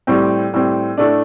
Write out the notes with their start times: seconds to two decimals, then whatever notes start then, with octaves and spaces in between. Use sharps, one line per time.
0.07 A2 G3 C4
0.53 A2 G3 C4
0.98 A2 A3 D4